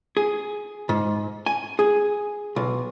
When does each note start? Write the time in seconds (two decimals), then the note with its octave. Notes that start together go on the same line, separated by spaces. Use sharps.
0.17 G#4
0.89 G#2
1.46 G#5
1.79 G#4
2.56 B1